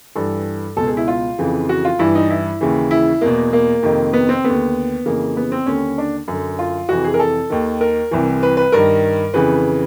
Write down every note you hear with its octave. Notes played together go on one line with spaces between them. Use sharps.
G2 E3 A4
C#2 B2 A4
G#4
E4
F4
F2 C#3 E3
F#4
F4
G2 E3 E4
D#4
E4
D#2 C#3 E3
E4
E2 B2 A#3
A#3
F2 C3 D#3
B3
C4
D3 B3
D#2
F2 C#3 E3 A#3
B3
C4
D#2 D3 C#4
D4
F#2 D3
F4
F2 C3 E3 F#4
G#4
A#4
A4
D#2 D#3
A#4
C2 C3 E3
B4
B4
G2 D#3 A#4
F2 C#3 E3 B4